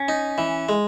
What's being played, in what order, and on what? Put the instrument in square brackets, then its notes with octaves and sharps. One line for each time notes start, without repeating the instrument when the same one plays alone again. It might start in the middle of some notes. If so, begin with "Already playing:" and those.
Already playing: [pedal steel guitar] C#4
[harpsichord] D#4
E3
G#3